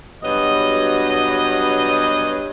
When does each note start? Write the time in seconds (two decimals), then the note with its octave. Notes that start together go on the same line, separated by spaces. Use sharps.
0.24 G2 B2 F#3 D#5